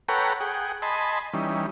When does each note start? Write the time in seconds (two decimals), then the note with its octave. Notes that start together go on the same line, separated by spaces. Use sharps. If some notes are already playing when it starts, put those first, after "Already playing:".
0.09 A4 B4 C#5 F#5 G5 A#5
0.41 G#4 F#5 G5
0.82 D#5 G#5 A5 B5 C6
1.34 E3 G3 C#4 D#4